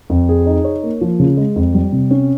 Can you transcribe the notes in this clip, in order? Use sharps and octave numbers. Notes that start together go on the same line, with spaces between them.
F2
G#4
D#4
C#5
A#3
F3
C#3
G#3
F2
G3
C3
C#4